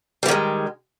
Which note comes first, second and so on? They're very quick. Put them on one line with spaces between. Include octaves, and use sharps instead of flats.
G3 E3 D#3 G#3